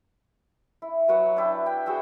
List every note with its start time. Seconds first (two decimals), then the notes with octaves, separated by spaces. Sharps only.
0.82 E4
1.08 F#3 B4 C#5 F#5
1.37 D4 E4 G5
1.66 G5
1.86 F#4 G#4 E5 G5